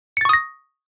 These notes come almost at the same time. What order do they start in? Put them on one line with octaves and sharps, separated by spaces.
C#7 A6 C#6 D#6 A#6